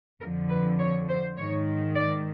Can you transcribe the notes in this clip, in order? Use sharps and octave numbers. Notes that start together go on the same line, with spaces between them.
F2 D3 F3 A#4
B4
C#5
C5
G#2 D#3 C#5
D5